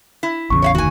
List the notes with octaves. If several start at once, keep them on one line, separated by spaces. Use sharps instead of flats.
E4
A1 E2 C#3 C#6
C#5 E5 F5
F1 D2 D#3 F#4 G#5